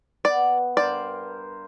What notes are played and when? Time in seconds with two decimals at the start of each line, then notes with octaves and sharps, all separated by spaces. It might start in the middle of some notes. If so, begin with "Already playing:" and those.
0.25 B3 D5
0.77 G2 A#4 C5 D5